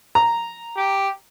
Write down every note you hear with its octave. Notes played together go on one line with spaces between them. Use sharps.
A#5
G4